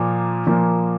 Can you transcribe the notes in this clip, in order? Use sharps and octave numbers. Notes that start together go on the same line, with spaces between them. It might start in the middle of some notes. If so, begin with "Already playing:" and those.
Already playing: A#2 F3 A#3
A#2 F3 A#3